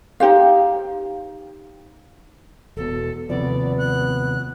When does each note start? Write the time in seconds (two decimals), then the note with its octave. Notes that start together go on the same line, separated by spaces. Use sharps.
0.20 D#4 G4 C5 F5
2.77 E1 B2 A4
3.29 D#2 C3 F3 B3 D5
3.78 F#6